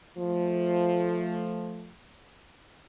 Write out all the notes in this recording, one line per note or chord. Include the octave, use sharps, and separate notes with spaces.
F3 A3